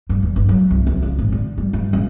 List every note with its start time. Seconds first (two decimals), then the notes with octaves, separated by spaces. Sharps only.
0.09 G2
0.23 E2
0.36 G1
0.49 F#3
0.71 C2
0.87 C#2
1.02 C#2
1.19 G#1
1.32 D3
1.58 G3
1.73 G2
1.93 C#2